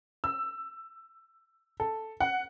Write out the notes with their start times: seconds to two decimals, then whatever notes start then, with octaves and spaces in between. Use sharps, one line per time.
0.24 E6
1.80 A4
2.20 F#5